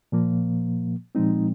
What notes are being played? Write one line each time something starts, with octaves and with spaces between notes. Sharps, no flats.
A#2 F3 A#3
A#2 F3 G#3 C4 D#4